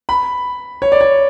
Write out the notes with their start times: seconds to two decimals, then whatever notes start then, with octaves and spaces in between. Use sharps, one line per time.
0.09 B5
0.82 C#5
0.92 D5
1.01 C#5